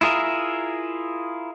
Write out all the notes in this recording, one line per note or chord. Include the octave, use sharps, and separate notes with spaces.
E4 F4 G#4 A#4 E5